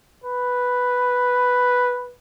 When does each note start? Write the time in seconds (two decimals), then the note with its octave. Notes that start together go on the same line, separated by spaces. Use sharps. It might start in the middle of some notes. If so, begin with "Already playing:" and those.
0.24 B4